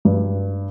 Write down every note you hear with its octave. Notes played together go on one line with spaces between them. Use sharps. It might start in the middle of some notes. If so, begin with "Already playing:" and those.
G2